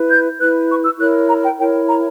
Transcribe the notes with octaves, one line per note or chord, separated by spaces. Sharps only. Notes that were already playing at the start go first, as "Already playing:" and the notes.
Already playing: E4 B4
G6
E4 B4 F#6
C#6
E6
E4 A#4 C#5 F#6
A#5
G5
E4 A#4 C#5 G5
A#5